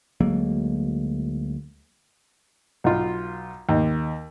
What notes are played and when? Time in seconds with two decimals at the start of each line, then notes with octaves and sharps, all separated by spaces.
0.21 D2 F#3 G#3 A#3
2.84 B1 F4
3.69 D#2